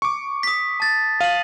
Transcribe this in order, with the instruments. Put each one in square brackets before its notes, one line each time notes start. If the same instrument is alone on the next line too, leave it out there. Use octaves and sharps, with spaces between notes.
[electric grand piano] C#6 D6
[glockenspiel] D#6 B6
A5 A6
[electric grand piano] F5 [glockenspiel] D#7 F#7